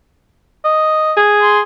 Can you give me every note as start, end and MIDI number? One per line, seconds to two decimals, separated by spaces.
0.65 1.13 75
1.17 1.62 68
1.42 1.61 84